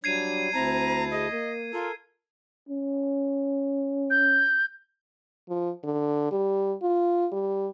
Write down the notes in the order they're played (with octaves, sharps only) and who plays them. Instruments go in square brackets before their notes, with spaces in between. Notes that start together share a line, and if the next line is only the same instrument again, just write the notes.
[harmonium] F#3 G3 [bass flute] D4 [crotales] G#6 C7 D#7
[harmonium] D2 E4 A5 [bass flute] C4 [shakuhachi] A#5
[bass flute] G#4 [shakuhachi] D#5
[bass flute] A#3
[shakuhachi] F4 [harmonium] A4 A#4
[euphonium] C#4
[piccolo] G6
[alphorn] F3
D3
G3
F4
G3